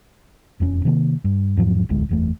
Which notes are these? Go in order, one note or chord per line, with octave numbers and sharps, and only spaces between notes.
E1 F2 G3 C#4
C3 D#3 A#3
G2
E2 G#2 F3 F#3
E1 A1 D2 G#3
F#1 E2 A3